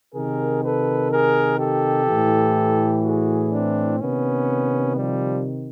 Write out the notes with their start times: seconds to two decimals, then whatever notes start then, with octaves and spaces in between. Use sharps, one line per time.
0.14 C3 D#3 G#4 A#4
0.63 A4 B4
1.10 G#4 A#4
1.59 G4 A4
2.07 A2 E3
3.04 F#4 G#4
3.51 C4 D4
4.00 C3 D#3 B3 C#4
4.97 F3 G3